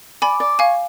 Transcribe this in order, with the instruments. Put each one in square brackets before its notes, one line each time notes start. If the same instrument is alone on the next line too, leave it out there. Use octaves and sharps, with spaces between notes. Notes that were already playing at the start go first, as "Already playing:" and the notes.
[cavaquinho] D5 [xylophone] G#5 B5
[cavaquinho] D5
[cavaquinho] C#5 [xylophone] F5 G#5